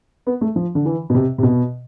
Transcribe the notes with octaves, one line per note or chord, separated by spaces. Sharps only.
B3
A3
F3
D3
E3
B2
C3
C3
B2